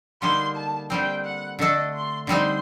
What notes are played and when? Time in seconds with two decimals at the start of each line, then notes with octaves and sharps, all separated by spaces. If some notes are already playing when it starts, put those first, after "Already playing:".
0.22 D3 G3 A#3 D#4 C6
0.56 A5
0.90 D3 G3 C4 G5
1.25 F#5
1.59 D3 A3 D4 A4 D#5
1.94 C6
2.27 D3 G3 C4 D#4 C6